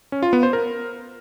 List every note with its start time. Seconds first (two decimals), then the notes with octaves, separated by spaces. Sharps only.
0.12 C#4
0.23 F4
0.33 B3
0.43 C5
0.53 A#4